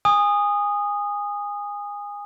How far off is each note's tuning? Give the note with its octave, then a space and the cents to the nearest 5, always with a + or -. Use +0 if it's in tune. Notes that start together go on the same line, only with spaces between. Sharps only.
G#5 -25 D#6 -10